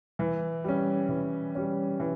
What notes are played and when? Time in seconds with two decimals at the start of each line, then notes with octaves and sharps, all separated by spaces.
0.19 E3
0.64 G3 C#4
1.09 E3
1.55 G3 C#4
2.00 E3